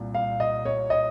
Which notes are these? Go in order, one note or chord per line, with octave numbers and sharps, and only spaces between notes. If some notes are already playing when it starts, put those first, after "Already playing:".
Already playing: C2 A#2
F5
D#5
C#5
D#5